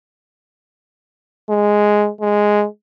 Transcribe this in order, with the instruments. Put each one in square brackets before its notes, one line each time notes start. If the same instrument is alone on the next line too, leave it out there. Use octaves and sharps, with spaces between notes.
[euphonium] G#3
G#3